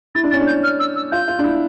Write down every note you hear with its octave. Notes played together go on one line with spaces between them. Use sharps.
E4 A6
D4
C#4 A6
D4
G6
F6
E6
E6
F4 G6
F4
D4
E4